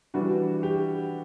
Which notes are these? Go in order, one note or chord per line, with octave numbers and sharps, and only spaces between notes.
E3 G3 D4 F#4
G4